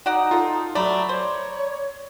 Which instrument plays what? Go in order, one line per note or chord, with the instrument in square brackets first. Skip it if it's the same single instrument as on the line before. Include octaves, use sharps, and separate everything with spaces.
[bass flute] D#4 [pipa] F#4 D5 F#5
[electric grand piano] F4 A4
[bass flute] F#3 [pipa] A3 [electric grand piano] D5 A#5 B5
[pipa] C5 [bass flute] C#5